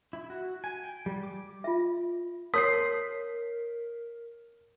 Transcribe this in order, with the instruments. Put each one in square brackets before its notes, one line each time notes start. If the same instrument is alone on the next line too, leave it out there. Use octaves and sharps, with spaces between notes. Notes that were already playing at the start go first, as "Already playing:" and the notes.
[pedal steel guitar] E4
F#4
G#5
G5
G3
D6
[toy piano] F4 E5
[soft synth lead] A#4 [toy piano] C#5 C6 [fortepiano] D#6 [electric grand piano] B6 C7